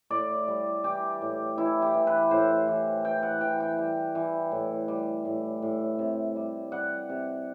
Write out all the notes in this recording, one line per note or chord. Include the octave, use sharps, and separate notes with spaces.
A2 D5
G3
E3 G4
A2
E3 E4
G4
E3
B4
A2 C5
E3
E3 G5
F#5
E3 G5
G5
G3
E3
A2
G3
A2
A2
C3
G3
G3 F#5
C3